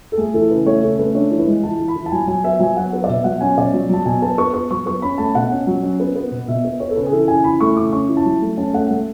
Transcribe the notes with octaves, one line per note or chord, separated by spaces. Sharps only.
A4
A3 G#4
E3 A4
C#3 B4
A3 C#5
C#3 A4
A3 B4
D4 C#5
E3
B4
G#3
E3 A5
E3
B5
E3
A5
F#3 G#5
F#3 G#5
B3 E5
F#3 G#5
B3 F#5
B3
D5
B2 E5
F#3 F#5
C#4 G#5
B2 D5
F#3
F#3 A5
B2 G#5
B3 A5
B3 C#6
B3 C#6
F#3 C#6
B3 C#6
C#4 B5
A3 A5
B2 F#5
C#4
F#3
C#4
B3
B3
B2
B2 E5
B3
B3 C#5
A4
C#3 B4
G#4
E3 A4
C#3 G#5
E3 B5
A3 C#6
C#3 D6
C#4 C#6
E4
A5
F#3
A3
C#4 A5
A3 F#5
A3